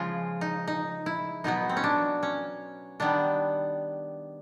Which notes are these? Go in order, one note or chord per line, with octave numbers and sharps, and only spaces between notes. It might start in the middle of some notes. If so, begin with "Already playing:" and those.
Already playing: C#3 F3 G#3 F4
D#4
D#4
E4
B2 F#3 B3 D#4
C4
C#4
D4
C#4
D#3 G3 B3 D4